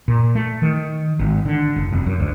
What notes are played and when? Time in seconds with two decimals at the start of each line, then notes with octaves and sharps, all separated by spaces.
0.08 A#2
0.35 A3
0.62 D#3
1.19 G#1
1.45 D3
1.76 F#1
1.92 F1
2.06 F#2
2.20 D2